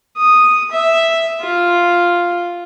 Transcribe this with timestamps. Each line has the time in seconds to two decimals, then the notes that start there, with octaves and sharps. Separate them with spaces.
0.17 D#6
0.71 E5
1.41 F4